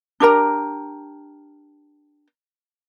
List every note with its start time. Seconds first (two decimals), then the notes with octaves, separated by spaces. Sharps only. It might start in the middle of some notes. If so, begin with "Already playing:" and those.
0.20 D4 G4 A#4 A#5